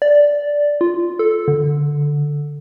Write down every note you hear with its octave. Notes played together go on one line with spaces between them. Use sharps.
D5
F4
A4
D3